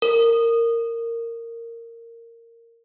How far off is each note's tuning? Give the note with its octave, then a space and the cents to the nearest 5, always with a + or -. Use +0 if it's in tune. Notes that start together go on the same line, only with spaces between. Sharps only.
A#4 -15